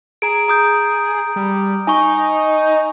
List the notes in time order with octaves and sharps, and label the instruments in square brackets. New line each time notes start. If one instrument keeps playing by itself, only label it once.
[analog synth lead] G#4 [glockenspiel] A#5 D7
[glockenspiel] A#5 D#6 G6
[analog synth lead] G3
[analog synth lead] D#4 [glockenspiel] G#5 C#6